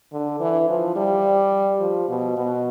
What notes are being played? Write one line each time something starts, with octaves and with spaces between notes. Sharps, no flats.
D3
E3
F3
G3
F3
B2
B2